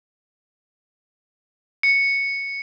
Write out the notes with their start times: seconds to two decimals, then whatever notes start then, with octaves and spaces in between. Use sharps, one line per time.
1.83 C#7